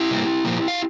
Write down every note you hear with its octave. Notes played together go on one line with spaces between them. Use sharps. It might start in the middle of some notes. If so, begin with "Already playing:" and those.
Already playing: E4 G4
C3 G3 A#3
A#2 F3 A#3
F5